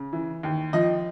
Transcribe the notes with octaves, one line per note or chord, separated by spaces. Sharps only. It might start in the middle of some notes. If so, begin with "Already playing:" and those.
Already playing: C#3
E3
D#2
F3 D#5